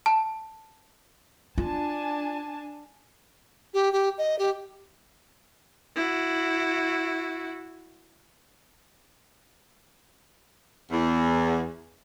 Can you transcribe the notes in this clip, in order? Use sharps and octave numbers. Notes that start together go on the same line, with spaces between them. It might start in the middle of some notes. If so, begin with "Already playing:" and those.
A5
D4 F4 G#5 A5
G4
G4
D#5
G4
E4 F#4
E2